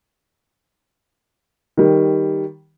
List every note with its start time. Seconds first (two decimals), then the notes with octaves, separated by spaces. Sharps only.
1.77 D#3 G3